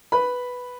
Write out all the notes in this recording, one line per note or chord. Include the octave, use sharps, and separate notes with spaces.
B4 B5